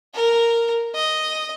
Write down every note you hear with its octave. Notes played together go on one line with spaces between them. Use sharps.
A#4
D#5